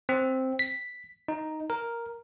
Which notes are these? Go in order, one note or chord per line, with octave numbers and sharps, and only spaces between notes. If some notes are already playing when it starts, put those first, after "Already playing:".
C4
B6
D#4
A#4